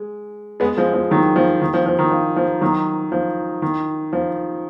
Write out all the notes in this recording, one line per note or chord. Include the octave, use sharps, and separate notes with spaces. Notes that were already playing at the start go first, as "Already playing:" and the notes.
Already playing: G#3
G#3 B3
F3 G#3
F3
D#3 F#3
F3
D#3
F3
F3
D#3
F3
F3
D#3 F#3
F3
D#3
F3